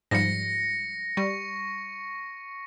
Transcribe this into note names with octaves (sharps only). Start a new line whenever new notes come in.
G#2 F3 G3 A#6 C#7
G3 C#6